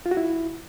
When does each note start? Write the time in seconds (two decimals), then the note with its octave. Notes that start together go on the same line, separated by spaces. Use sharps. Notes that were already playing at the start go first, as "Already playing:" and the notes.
0.06 F4
0.11 F#4
0.17 E4